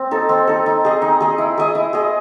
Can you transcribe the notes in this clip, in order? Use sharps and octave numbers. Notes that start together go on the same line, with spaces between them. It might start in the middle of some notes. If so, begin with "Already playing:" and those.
Already playing: C4
D#4 A4
C4
D#4 A4
D#4
G#4 D#5
D#4
G#4 D#5
E4
G#4 D#5
E4
G#4 D#5